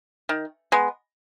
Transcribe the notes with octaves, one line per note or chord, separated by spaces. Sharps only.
D#3
G#3 B3